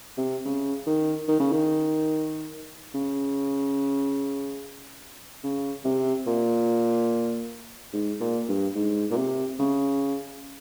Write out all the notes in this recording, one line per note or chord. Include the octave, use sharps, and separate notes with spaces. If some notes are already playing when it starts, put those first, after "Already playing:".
C3
C#3
D#3
D#3
C#3
D#3
C#3
C#3
C3
A#2
G#2
A#2
G2
G#2
A#2
C3
C#3